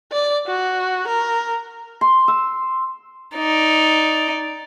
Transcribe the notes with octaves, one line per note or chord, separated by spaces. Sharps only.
D5
F#4
A#4
C6
E6
D#4 D5